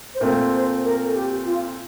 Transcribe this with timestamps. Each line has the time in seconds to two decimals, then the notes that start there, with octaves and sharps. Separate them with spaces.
0.15 C5
0.21 A#2 A3 C4 A#4
0.53 C5
0.84 A#4
1.05 A4
1.15 G4
1.45 F4